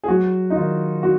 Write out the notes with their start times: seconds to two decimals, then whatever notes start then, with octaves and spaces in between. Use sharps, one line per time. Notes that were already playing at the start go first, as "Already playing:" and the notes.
0.04 G#4
0.08 F#3 F#4
0.50 D#4
0.56 D#3 F4
1.03 D#3 F#4